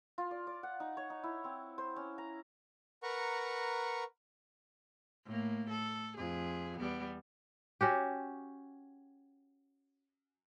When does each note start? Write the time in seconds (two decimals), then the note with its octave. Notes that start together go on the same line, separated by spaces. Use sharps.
0.18 F4
0.31 D5
0.47 D5
0.63 F#5
0.80 D#4
0.97 C#5
1.10 D#4
1.24 E4
1.44 C4
1.78 C5
1.96 C#4
2.18 A#5
3.03 A#4 B4 F#5 A#5 C#6
5.26 A2 A#3
5.70 A4
6.17 F2 G#4
6.79 E2 G3 B3
7.81 C#4 F#4 G4